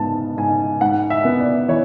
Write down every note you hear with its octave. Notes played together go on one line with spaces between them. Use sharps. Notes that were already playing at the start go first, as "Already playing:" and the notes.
Already playing: G#2 B3 A5
G#2 G#5
G#2 F#5
E5
B3
D5
E3 C#5